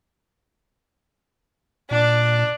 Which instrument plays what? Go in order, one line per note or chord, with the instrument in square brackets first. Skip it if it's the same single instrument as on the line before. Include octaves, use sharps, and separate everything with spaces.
[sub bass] A#2 [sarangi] D4